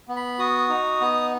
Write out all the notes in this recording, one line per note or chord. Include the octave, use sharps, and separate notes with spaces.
B3
B5
F#4 D#6
D#4
B3